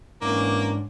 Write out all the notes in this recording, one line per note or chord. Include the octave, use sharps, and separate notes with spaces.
G#2 E3 A#3 B3 C#4 D4